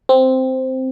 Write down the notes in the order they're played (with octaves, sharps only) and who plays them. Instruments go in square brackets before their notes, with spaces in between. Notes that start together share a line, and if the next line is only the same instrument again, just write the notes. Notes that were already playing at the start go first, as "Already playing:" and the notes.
[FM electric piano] C4